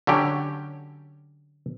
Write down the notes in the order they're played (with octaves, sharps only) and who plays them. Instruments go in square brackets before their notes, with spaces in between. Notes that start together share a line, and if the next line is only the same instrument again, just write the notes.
[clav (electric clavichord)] D3 F#3 C#4 G4